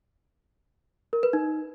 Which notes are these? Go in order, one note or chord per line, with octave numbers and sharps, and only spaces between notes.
A#4
B4
D#4